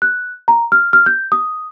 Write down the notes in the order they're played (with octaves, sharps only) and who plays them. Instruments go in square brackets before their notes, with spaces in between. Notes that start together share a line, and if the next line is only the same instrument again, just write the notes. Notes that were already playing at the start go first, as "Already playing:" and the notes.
[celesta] F#6
A#5
F6
F6
G6
D#6